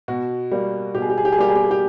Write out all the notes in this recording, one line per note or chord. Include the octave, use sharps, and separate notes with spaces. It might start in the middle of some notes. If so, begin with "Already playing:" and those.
B2 F#4
G3 A#3
B2 G4
G#4
G4
G#4
G4
G#4
G3 A#3 G4
G#4
G4
G#4
G4